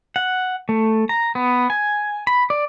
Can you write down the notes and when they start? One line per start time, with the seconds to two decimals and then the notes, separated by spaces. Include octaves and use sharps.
0.16 F#5
0.69 A3
1.09 A#5
1.35 B3
1.70 G#5
2.27 B5
2.50 D5